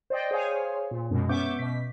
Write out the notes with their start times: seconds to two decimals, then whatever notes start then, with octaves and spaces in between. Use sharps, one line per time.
0.10 C5 D5 D#5 G5
0.31 G#4 C5 C#5 F5 G#5
0.91 A#2
1.11 F#2 B2 G#3
1.29 B3 C#4 E5 C#6 D6 G6
1.59 B2 B6